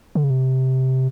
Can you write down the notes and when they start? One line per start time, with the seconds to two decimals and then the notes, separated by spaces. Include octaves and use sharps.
0.15 D3
0.24 C#3
0.30 C3